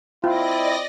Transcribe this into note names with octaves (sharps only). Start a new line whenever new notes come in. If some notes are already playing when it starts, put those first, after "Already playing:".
C4 E4 F4 D5 D#5 A#6